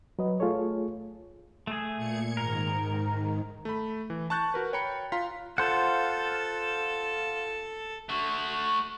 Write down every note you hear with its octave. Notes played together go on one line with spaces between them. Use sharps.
F#3 B4 D#5
A3 F4 G#4 A4 C#5
A3 G#4
A#2 G#6 C#7
G#2 D#3 A#4
A3 B5
E3
A5 C#6 F#6 G6 A6
F#4 A#4 B4
C#5 G5 A#5 B5 C#7
F4 F5 A#5 C6 B6
F4 A4 C5 F#5
A3 F#4